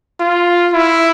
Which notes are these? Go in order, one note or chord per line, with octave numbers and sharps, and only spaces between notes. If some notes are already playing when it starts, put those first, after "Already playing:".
F4
E4